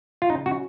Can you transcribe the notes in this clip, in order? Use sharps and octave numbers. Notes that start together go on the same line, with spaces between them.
F4
C#3 D#4
F#3 C#4 F#4